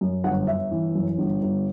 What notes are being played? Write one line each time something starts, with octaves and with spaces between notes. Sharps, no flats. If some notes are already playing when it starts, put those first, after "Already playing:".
F#2
G1 F#5
G1 E5
E3
F#2
G1
G1